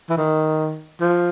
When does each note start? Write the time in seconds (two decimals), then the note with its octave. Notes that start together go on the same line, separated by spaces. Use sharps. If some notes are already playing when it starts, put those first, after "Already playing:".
0.10 E3
0.17 D#3
1.01 F3